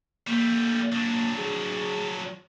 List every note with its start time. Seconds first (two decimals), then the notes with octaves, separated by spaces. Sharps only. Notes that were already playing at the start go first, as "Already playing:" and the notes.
0.27 G3 A3 A#3
0.92 F#3 D4
1.37 G#4